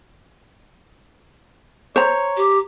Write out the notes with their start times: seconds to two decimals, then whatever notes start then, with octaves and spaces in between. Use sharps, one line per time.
1.96 C5 C#5 A#5
2.37 G4